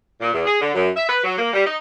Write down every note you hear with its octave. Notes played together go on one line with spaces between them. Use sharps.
A#2
E2
G#4
D3
F#2
E5
B4
F#3
A#3
G3
D#4